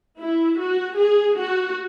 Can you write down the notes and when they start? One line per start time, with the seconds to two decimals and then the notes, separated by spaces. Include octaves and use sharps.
0.20 E4
0.60 F#4
0.98 G#4
1.38 F#4